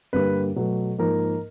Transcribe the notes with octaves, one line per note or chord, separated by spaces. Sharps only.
G2 D3 G3 A#3 B4
B2 F#3 A3
G#2 F3 A#3 A#4